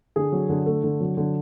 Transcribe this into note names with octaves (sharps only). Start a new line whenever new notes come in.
D3 G#4
F#3
D3
A3
D3
F#3
D3